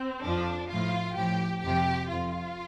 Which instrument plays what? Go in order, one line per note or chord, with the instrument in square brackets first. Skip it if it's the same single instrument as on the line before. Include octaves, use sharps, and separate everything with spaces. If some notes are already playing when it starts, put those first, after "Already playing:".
Already playing: [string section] C4
F2 F3 D4
A2 F3 F4
A2 F3 G4
F2 C3 F3 G4
F2 F3 F4